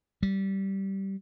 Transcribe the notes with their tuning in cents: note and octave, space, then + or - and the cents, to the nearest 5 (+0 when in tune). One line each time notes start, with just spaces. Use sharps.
G3 -15